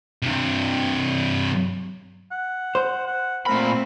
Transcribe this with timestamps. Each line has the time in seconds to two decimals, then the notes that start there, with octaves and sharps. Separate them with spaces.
0.23 G2 C3
2.31 F#5
2.75 C5
3.07 F#5
3.46 A#2 A3 C4 A#4 B5